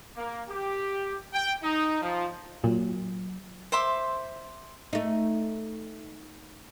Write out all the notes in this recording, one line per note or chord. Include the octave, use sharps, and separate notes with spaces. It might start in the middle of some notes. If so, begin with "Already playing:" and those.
A#3
G4
G5
D#4
F3
A#2 F#3
C5 E5 C6 D6
A3 D#4